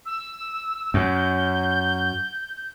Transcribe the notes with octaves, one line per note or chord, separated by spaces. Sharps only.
E6
F#2 G6